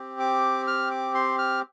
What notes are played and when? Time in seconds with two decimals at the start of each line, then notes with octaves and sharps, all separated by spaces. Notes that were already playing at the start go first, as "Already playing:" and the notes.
Already playing: C4 G4
0.20 D6
0.67 F6
0.91 D6
1.15 C6
1.39 F6